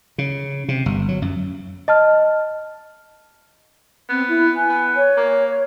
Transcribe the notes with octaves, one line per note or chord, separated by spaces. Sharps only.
C#3
C3
G1
F#3
F#2
D#5 A5 F6
B3 C4
E4
G#5
B3
C#5
A#3